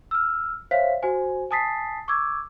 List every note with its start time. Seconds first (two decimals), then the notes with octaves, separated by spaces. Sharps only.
0.11 E6 F6
0.71 C5 C#5 E5 F5 B6
1.03 F#4 C5 G#5
1.51 G#5 A5 D#6 A6 B6 C7
2.08 C#6 D6 E6 G#6